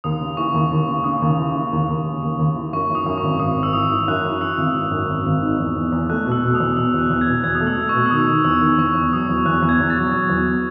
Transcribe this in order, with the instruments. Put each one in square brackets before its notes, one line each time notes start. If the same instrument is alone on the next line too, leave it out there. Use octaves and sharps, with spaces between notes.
[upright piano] D#2 [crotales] D#6
[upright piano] C#3
[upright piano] E3 [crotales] C#6
[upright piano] D#2
D#2
C#3
[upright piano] C#3 [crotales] D#6
[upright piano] D#2
E3
C#3
D#2
D#2
C#3
D#2
D#2
E3
[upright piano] F#2 [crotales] C#6
[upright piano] E3
[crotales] D#6
[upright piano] F#2
[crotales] C#6
[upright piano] G#1
[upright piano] G#1 [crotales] D#6
[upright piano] G#1
[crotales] E6
[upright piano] E3 [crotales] D#6
[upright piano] E3
[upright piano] F#2 [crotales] F#6
[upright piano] E3
[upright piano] E3 [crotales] E6
[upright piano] G#1
G#1
F#2
G#1
G#1
D#4
E2
E2
E2
[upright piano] A3 [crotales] F#6
[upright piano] B2
[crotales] E6
[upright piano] B2
[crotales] D#6
[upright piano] E2
[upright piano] B2 [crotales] E6
[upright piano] E2 [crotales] F#6
[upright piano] E2 [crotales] F#6
[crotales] G#6
[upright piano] B2
[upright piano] E2 [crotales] G#6
[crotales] D#6
[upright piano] A3
[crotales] E6
[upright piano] A3
[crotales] C#6
[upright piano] B2
[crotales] E6
[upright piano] D#3 [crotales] D#6
[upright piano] D#3
[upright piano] E2 [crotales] E6
[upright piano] D#3
[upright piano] E2 [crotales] C#6
[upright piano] E2
[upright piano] F#3 [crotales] D#6
[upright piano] E2
[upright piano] E2 [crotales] F#6
[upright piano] E2
[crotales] G#6
[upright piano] E2
[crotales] A6
[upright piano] F#3
F#3
E2